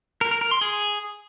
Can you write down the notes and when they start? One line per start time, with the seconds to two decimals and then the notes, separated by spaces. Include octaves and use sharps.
0.21 A#4
0.31 A#4
0.41 A#4
0.51 C6
0.61 G#4